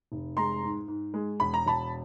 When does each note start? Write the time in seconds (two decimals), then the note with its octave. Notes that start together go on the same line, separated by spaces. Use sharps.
0.12 F1
0.37 G#3 A#5 C6
0.63 G#2
0.88 G#2
1.14 G#3
1.40 E1 B5
1.54 A#5
1.66 E1 A5 B5